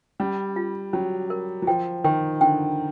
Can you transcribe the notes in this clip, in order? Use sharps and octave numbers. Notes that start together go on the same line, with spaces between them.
G3 C#4
F4
F#3 C#4
A#4
F#3
F3 G5
D#3 G5
D3 G5